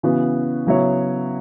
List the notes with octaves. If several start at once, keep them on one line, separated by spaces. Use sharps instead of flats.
C#3 E3 B3 F#4
C#3 F#3 B3 E4 C#5